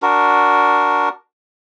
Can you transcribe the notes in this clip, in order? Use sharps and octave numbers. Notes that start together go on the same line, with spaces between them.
D4 F#4 A#4